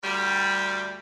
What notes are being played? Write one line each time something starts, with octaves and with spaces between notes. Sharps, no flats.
D2 G3